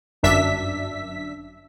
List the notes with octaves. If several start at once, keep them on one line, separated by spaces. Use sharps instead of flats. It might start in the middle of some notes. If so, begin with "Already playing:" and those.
G1 F#2 D4 E5 B6